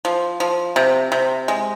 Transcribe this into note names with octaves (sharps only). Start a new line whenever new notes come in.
F3
F3
C3
C3
G#3